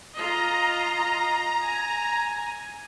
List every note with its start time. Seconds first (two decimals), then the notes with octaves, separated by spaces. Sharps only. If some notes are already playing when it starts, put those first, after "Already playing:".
0.14 F4 D#5 A#5
1.62 G#5